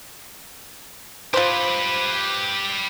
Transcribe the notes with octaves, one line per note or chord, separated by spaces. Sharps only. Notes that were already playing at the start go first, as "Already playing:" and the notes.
F3 G4 B4 C5